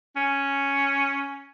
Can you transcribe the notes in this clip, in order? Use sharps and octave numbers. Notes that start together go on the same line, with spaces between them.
C#4